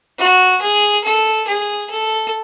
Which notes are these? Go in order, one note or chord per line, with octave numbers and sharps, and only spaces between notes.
F#4
G#4
A4
G#4
A4